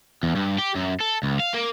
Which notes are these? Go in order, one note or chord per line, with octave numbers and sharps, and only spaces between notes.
E2
G2
G4
F#2
A4
C#2
F5
A#3